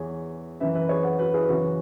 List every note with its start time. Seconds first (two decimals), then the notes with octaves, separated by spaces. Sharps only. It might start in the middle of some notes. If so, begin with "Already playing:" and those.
Already playing: E2 E3 G#4 C#5
0.60 F#2 E3 B4 E5
0.75 B4 E5
0.89 G#4 C#5
1.04 C#5 F#5
1.19 F#4 B4
1.34 E4 G#4
1.48 F#2 C#3 E3 C#4 F#4